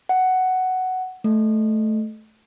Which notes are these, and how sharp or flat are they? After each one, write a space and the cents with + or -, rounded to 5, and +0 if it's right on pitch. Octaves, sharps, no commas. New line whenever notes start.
F#5 +5
A3 -15